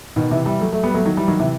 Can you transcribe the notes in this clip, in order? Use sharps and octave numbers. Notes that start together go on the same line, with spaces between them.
B2 D#3
C3 E3
E3 G3
F#3 A3
F#3 A3
G3 B3
F#3 A3
D#3 F#3
E3 G3
D#3 F#3
C3 E3